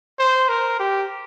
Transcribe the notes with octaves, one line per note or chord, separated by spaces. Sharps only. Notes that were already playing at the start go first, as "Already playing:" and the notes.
C5
A#4
G4